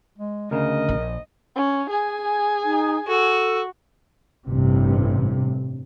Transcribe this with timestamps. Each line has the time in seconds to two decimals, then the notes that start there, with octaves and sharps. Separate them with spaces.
0.18 G#3
0.51 D2 C#3 A#4 D#5
0.89 A#1
1.56 C#4
1.90 G#4 G#5
2.65 D#4
3.07 F#4 A4
4.47 A1 G2 C3